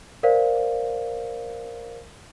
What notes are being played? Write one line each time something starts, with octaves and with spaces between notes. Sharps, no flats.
A#4 C5 D5 F5